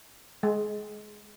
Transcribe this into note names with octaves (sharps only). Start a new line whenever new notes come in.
G#3